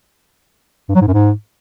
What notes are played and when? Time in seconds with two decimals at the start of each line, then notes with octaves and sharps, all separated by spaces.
0.89 G2
0.95 F#3
1.01 G#2
1.07 F#2
1.14 G#2